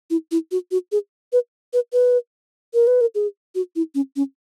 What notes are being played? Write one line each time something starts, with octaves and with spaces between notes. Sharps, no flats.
E4
E4
F#4
F#4
G#4
B4
B4
B4
A#4
B4
A#4
G#4
F#4
E4
C#4
C#4